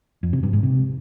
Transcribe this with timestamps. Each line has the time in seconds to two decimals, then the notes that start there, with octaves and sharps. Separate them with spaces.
0.23 F2
0.33 C3
0.43 G2
0.53 G#2
0.63 C3